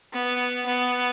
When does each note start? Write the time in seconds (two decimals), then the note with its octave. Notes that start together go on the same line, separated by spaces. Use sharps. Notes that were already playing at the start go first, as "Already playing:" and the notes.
0.13 B3
0.66 B3